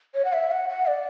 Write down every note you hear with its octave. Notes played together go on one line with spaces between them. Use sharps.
C#5
F#5
E5
F#5
F#5
D5